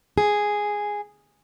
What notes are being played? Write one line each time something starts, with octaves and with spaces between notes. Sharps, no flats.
G#4